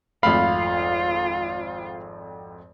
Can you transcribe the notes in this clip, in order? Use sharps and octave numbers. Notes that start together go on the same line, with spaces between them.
G#1 F2 A3 F4 F5 B5